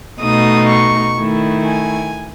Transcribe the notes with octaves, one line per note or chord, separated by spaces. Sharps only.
B2 A3 D#4 D#6
C#6
D#3 A3 E4
G#5